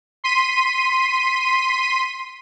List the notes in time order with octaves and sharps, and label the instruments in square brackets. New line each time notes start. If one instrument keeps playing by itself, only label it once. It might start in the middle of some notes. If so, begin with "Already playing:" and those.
[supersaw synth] C6 B6 D#7